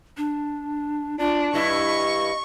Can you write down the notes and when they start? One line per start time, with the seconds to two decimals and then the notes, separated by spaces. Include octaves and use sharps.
0.17 D4
1.19 D4 F4
1.54 G2 E4 D#5 C#6